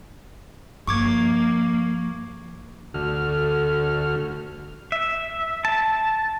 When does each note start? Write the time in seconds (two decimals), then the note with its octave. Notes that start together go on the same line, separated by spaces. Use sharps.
0.87 G2 F3 A#3 C#6 D6 G#6
2.94 D2 D3 F#4 A4 F6
4.92 E5
5.65 A5